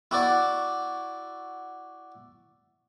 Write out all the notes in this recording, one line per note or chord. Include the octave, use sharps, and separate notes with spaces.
E4 F#4 D5